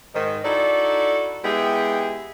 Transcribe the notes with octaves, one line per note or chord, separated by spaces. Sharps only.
G#2 D#3
D#4 E4 F#4 A4 D5
G#3 B3 E4 G4 G#4 G5